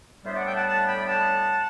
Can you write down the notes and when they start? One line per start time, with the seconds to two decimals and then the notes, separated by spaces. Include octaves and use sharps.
0.24 A2 G3 B3 D4 C5 E5
0.35 D5 F#5
0.45 E5 G5
0.55 F#5 A5
0.66 F#5 A5
0.86 G5 B5
1.06 F#5 A5